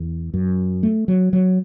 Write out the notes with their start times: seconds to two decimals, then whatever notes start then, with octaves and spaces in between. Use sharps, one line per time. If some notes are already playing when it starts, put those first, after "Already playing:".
Already playing: E2
0.34 F#2
0.83 A3
1.08 F#3
1.33 F#3